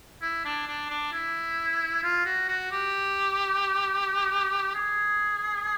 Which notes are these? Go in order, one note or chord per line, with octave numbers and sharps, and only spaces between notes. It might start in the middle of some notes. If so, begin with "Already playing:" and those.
E4
D4
D4
D4
E4
F4
F#4
F#4
G4
G#4